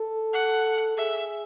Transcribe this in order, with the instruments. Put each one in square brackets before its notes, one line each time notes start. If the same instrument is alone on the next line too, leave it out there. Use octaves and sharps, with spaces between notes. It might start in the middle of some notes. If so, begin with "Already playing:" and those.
Already playing: [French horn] A4
[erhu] F#5
[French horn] G#4 [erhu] E5